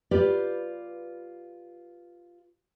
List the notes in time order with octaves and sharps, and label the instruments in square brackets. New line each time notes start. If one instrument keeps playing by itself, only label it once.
[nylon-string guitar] F4 G4 B4 D5